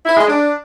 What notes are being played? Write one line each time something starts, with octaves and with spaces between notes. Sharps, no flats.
E4
G#3
D4